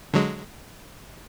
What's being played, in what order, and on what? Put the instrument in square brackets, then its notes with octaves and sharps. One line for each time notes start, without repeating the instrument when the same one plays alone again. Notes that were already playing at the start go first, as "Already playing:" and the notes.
[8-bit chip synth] D3 F#3 G#3